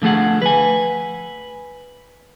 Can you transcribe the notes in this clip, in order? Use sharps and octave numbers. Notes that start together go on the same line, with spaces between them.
D3 F3 A3 G#4 F#5
B4 G#5